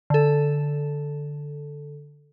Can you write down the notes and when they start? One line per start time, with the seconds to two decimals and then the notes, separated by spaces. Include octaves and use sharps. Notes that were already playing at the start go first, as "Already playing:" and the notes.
0.10 D3 A4